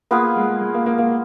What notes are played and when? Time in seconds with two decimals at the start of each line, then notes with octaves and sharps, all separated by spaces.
0.11 A#3 B3 F4 G#4 B4
0.36 G#3
0.61 G#3
0.75 A#3
0.86 A#3
0.99 A#3